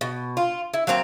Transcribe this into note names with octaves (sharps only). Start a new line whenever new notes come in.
B2
F4
E4
F#3 A#3 C4 A#5